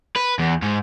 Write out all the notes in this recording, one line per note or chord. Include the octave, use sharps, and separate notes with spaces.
B4
E2
G#2